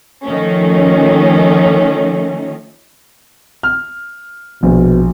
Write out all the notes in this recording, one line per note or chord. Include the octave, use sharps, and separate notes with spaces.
D#3 F3 A3 C#4
F6
A#1 B2